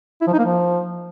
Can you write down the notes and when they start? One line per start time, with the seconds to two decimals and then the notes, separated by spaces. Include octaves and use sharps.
0.21 E4
0.27 F3
0.33 D#4
0.39 A#3
0.45 F3